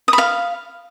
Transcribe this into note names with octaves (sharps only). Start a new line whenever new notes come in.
D#6
B5
F5